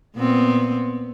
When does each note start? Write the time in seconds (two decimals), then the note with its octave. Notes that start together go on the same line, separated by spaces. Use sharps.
0.17 A#2 B3 C4